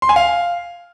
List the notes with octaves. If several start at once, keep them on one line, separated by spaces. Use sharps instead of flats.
C6
G#5
F5